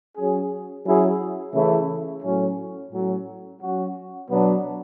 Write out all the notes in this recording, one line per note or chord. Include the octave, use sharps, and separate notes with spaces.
F#3 C#4 G#4
F#3 C#4 E4 G#4
C#3 E3 A3 E4
A2 F#3 C#4
A2 F#3 C#4
F#3 C#4 F#4
B2 F#3 B3 D4